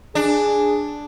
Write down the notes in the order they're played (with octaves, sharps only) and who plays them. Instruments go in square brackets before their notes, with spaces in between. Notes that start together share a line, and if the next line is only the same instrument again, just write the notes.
[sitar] D4 [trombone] G#4